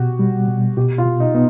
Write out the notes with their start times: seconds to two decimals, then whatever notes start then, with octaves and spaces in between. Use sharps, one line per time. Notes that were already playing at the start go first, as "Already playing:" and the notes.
Already playing: B2 F#4 G4
0.19 G3
0.48 B2
0.77 B2 G4
0.98 F4
1.06 B2
1.20 D#4
1.35 B3 D#4